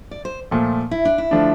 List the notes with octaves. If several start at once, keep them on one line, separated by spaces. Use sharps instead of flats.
D5
C5
A#2 F3 A3
E4
D4
E4
D3 F3 A3 D4